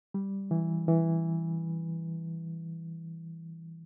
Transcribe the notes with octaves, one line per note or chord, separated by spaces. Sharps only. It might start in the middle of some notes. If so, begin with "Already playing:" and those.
G3
E3
E3